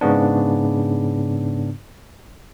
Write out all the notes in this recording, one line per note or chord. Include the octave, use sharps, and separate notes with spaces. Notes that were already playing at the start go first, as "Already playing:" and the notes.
G#2 C#3 B3 D4